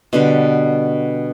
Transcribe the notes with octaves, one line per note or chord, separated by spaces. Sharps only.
B2 D3 G3